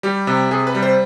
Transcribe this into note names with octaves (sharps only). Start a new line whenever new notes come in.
G3 G4
C3
C3 G#4
B4
G3
C5